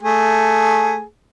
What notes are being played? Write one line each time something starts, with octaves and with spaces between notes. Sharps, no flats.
A3 G#4